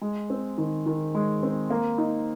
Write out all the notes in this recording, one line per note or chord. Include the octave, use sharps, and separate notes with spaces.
G#3
C4
D#3
D#3
G#3
C4
A#3
D#4